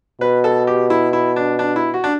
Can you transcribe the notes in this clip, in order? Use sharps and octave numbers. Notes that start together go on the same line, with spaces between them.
B2 B4
A4
G4
E4
E4
D4
D4
E4
F#4
D4